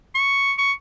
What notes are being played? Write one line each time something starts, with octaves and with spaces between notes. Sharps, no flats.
C#6
C#6